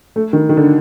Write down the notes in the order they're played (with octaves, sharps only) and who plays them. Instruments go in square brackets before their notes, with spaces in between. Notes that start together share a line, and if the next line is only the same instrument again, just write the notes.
[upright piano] A3
D#3
D#3
D3